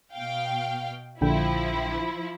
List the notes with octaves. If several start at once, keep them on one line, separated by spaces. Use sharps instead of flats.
B2 F5 G5
A#1 D3 F3 E4 G5